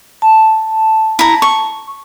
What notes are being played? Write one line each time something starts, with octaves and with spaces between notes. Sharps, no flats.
A5
E4 A#5
C#6